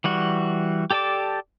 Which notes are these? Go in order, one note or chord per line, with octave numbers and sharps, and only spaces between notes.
E3 G3 F#4
G4 A4 D5 A5 D6